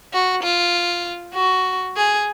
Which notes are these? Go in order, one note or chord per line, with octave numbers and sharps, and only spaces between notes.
F#4
F4
F#4
G#4